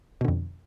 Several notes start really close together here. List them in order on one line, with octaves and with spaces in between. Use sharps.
B2 D3 F2